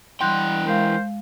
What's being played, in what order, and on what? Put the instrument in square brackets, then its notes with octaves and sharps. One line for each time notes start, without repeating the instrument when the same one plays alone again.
[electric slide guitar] E3 E4 G5 [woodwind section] G3 F#5 [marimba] C6 G6
[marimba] G#3 F5 [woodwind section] A#4 C5